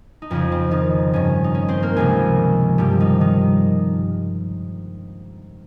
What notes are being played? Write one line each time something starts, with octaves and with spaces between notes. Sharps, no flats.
D#4
F2 C#3 F3 C#4
C4
D#3 D#4
G2 D#3 C#4
D#4
C#4
C4 C5
A#3 A#4
C#2 C3 F3 G#3 G#4
G2 F3 G3 G4
D#3 D#4
D#3 D#4